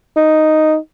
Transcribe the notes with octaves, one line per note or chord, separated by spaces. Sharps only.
D#4